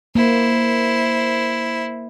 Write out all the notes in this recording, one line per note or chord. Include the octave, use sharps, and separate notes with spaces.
A#3 E4 C5